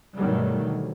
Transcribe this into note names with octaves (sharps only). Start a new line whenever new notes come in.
G2 B2 D#3 F#3 G3 A3
D2